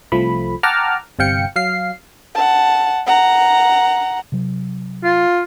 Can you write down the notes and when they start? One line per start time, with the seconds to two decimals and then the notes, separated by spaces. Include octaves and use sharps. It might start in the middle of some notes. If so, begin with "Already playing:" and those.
0.12 C2 F3 A3 B5
0.63 F#5 G5 A5 A#5 D6 F6
1.19 G1 C3 F5 G5 C#7
1.56 F#3 F5 C7
2.35 F#5 A5
3.07 F#5 A#5
4.32 C3 F#3
5.04 F4